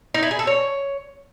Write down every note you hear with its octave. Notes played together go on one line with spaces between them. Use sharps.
D#4
E4
G#4
A4
C#5